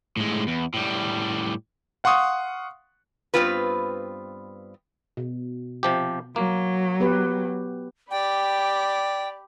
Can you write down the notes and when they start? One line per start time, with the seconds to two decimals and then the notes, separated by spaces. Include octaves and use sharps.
0.17 A2 G#3
0.48 E2
0.74 A2 G3
2.04 F5 F#5 C6 C#6 D#6
3.34 G2 C#3 B3 C4 F4 B4
5.17 B2
5.83 C3 F3 G4
6.36 F#3 A#3
7.00 B3 G4 B4
8.11 G4 D5 G5 B5